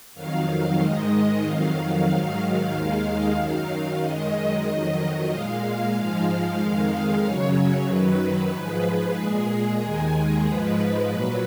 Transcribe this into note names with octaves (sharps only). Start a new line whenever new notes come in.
F2 D#3 F#3 F5
G#2 D#3 G#3 D#5
D#5
F2 D#3 F#3 F5
G#2 D#3 F#3
D#2 D#3 G#3
F#2 D#3 F#3 F5
F#2 D#3 G#3 D#5
F2 D#3 F#3
A#2 G#3 F5
G#2 F3 G#3 F5
F2 D#3 G#3
F#2 C#3 F#3 C#5
F#2 D#3 F#3 B4
G#2 F3 G#3
A#2 G#3 G#4
D#2 D#3 G#3
G#2 F3 G#3 B4
A#2 F#3